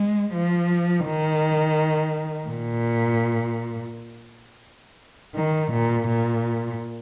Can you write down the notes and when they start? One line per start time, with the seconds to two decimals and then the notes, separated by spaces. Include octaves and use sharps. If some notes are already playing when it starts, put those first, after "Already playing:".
Already playing: G#3
0.34 F3
1.06 D#3
2.49 A#2
5.35 D#3
5.72 A#2
6.07 A#2